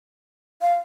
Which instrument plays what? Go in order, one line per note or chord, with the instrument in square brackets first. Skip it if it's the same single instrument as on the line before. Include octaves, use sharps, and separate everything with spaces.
[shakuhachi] F5